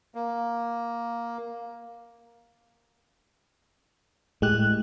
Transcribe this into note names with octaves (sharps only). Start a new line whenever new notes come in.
A#3
A2 G#3 G4 F#6